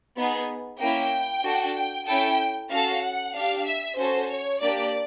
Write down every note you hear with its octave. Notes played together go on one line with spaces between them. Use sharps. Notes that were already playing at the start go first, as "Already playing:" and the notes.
B3 D#4 G#4
A#3 C#4 E4 G5
D4 F#4 A4
G5
C#4 E4 A4 G5
C#4 F#4 A4 F5
F#5
D4 G4 F5
E5
C#4 F#4 A4 C5
C#5
A#3 D4 G4 D5